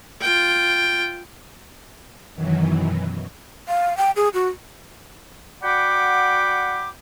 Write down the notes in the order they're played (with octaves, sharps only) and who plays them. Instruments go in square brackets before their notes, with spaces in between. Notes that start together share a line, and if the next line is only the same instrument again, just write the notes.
[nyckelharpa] F4 G5
[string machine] F#2 B2 D#3 E3 F#3
[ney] F5
G5
G#4
F#4
[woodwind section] F#4 D5 F#5 G5 B5 D6